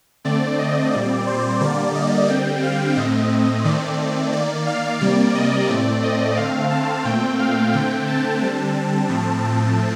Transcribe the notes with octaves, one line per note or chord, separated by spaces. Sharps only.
D3 A3 C4 D5
D#5
A#2 G3 C4 D5
C5
D3 G3 A#3 D5
D#5
D3 G3 C4 G5
F5
A2 A3 C4 D#5
D#3 A3 C4 D5
D#3 A#3 D5
F5
C3 G3 A#3 D5
D#5
A2 A3 C4 D5
D#5
D3 A3 C4 F5
A5
A#2 A3 C4 G5
F5
D3 A3 C4 G5
A5
D3 G3 C4
A2 F3 A3 C4